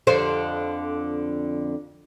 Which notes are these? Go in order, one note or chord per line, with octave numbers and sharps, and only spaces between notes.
F2 D3 C5